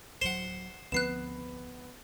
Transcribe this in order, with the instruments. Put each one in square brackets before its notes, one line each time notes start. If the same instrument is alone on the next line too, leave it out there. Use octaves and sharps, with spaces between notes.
[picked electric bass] D1 F#3 [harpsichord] C5 F#5
[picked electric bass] D2 F3 C4 [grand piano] B3 B4 [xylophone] F#6 C7 E7